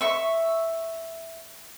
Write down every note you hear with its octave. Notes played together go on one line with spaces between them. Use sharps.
E5 C#6